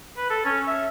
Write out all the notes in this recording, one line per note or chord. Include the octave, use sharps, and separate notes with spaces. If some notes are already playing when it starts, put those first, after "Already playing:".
B4
A4
C#4
E5